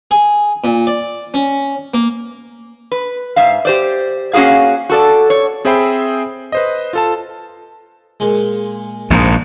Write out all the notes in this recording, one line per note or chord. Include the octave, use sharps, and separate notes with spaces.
G#4
A#2
D5
C#4
A#3
B4
G#2 E5 F5
G4 C5 D5
A#3 C#4 F4 F#4 G#4 F5
F#4 A4 D5
C#5
C4 G#4 C5 E5 G5 B5
B4 C5 D#5
F4 A4 A5
A#2 G#3
A#1 G#2